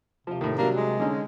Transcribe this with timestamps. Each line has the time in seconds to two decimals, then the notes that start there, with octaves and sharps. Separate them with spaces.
0.27 C3 F3 F4
0.41 A2 D#3
0.58 F#3 G3 A#3 D4
0.76 G#3
1.00 D3 C#4 D#4